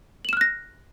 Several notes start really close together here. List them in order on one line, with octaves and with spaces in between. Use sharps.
F#7 E7 F6 F#6 A#6